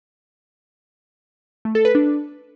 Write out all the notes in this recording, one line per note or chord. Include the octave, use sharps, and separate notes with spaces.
A3
A4
B4
D4